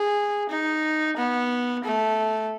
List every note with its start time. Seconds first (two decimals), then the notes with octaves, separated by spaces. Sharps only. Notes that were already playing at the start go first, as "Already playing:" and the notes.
Already playing: G#4
0.50 D#4
1.17 B3
1.84 A3